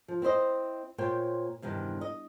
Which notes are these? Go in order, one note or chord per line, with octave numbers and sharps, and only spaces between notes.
F3
C4 E4 C5 D#5
A#2 C5 C#5 G5
E2 G2 C3 D#3
D#5